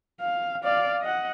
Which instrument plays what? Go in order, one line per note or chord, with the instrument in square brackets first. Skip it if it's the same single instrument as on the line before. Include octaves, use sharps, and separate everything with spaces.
[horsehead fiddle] F5
D5 F5
D#5 F#5